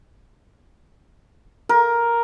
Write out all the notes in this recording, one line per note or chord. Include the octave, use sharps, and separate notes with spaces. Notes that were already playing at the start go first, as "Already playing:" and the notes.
A#4